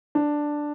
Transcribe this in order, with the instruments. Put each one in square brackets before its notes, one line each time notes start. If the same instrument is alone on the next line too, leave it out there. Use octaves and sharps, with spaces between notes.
[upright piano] D4